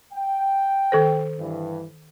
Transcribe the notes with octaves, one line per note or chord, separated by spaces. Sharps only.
G5
D#3 A4 C5
G2 E3